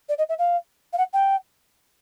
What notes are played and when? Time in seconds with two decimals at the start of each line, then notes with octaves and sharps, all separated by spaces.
0.09 D5
0.18 D#5
0.29 E5
0.38 F5
0.93 F5
0.98 F#5
1.13 G5